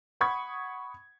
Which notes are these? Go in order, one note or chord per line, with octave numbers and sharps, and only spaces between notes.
F#5 B5 C#6 D#6 G#6